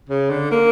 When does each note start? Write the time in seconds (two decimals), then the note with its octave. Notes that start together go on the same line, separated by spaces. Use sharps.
0.10 C#3
0.30 D3
0.52 A#3